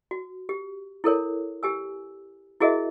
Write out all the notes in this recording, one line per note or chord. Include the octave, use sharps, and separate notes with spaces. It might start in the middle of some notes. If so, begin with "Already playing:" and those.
F#4
G4
E4 A4 A#4 C#5
G4 G#5 E6
E4 F#4 G#4 A#4 D#5 E5